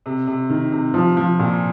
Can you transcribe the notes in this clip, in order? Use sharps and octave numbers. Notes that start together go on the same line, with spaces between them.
C3
C3
D#3
C3
F3
F3
A#2